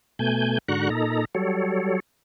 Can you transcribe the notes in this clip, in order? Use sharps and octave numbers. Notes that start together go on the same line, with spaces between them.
B2 A3 G#5 G6
G#2 D3 F#4 A#5 C#6 F#6
A#2 D#4 A4 A#5
F#3 G3 A4 C#5